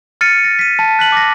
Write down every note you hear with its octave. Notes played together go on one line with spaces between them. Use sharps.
F6 A6 C#7 D#7
A#6
B6 D#7
A5
F#6 B6 F#7
D6 A#6